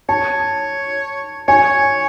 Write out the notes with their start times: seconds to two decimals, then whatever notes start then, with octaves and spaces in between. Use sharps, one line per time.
0.09 C#5 A5
1.48 C#5 G#5